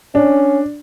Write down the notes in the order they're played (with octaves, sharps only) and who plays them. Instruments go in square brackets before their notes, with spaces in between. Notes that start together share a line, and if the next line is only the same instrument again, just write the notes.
[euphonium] C#4 [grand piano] D4